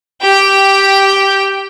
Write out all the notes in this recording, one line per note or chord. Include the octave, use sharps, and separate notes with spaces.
G4 G5